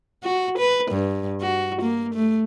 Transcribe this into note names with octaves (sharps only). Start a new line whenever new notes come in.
F#4
B4
G2
F#4
A#3
A3